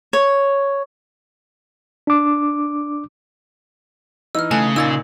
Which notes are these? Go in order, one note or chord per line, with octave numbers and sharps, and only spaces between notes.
C#5
D4 D6
E3 D#4 E6 F6
C#3 A3 G#5 A5 F#6
A#2 D#4 E6 G#6 A6